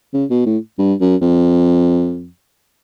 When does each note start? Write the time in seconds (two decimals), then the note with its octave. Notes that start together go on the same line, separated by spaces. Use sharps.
0.14 C#3
0.30 B2
0.46 A2
0.78 G2
1.00 F#2
1.21 F2